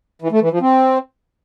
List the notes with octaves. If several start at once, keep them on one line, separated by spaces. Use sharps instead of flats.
E3
A3
E3
F3
C4